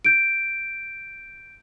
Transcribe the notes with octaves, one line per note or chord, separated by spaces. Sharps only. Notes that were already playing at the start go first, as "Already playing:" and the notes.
G6 D7